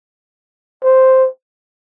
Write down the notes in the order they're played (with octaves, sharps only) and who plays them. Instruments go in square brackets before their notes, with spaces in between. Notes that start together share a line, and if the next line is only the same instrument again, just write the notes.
[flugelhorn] C5